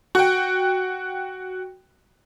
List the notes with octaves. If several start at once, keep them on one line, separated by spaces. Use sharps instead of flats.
F#4 G5